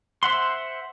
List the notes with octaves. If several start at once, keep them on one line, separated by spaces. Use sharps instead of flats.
C5 E5 F#5 C6